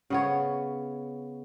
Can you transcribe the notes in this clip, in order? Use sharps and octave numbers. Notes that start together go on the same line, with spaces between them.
C#3 B3 C#5